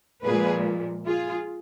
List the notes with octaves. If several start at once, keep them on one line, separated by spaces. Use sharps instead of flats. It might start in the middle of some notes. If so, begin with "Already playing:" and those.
A#2 F3 G#3 G#4 B4
F4 G#4